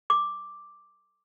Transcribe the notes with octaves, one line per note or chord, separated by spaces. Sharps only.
D6